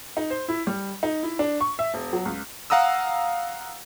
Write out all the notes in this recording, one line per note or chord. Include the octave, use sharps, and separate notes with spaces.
D#4
C5
E4
G3
D#4
E4
D4
C#6
E5
E1
F#3
C#2
F5 F#5 A#5 D#6 E6